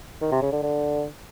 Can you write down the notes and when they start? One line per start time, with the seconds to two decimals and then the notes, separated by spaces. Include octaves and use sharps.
0.22 D#3
0.32 C3
0.42 C#3
0.52 D3
0.63 D3